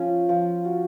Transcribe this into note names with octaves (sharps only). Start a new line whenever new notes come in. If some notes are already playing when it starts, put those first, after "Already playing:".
Already playing: F3 C#4 F4
F3
F#4